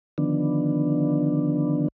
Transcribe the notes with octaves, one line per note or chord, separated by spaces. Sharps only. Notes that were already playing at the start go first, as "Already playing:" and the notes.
D3 D#3 F3 B3 D4